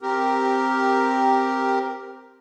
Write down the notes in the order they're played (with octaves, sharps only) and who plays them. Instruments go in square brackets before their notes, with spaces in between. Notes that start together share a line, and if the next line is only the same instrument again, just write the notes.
[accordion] C4 G4 A#4